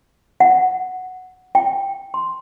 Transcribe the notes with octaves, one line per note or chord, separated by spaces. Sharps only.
F#5
G5
C6